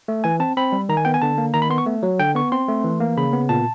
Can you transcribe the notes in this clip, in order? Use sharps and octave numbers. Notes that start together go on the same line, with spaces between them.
A3
E3 G#5
C4 A5
C4 B5
G3
D#3 A#5
G#5
B3 G5
G#5
D3 A5
A#3
D#3 A#5
B5
B3 C6
C#6
A3
F#3
D3 G5
B3 C#6
C4 C6
A3
E3
A#3
C#3 B5
B3
A#2 A5